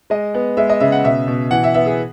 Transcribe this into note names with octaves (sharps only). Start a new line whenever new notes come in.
G#3 D#5
B3
G#3 E5
D#5
C#3 E5
F#5
B2 E5
B2
E3 F#5
E5
B3 E5
G#4